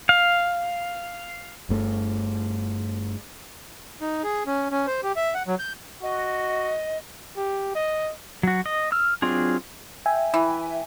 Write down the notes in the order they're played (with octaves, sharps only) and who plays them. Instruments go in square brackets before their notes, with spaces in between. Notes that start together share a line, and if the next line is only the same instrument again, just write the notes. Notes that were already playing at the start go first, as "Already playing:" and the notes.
[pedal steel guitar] F5
[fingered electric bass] G1 G2 A3
[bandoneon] D#4
G#4
C#4
C#4
C5
G4
E5
F#5
F#3
G6
[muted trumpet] F#4 [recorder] D#5
[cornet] G4
D#5
[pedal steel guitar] F#3 F#4
D#5
E6 F6
F#3 C4 D4 F4 G#4
[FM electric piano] E5 G5 G#5
[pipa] E3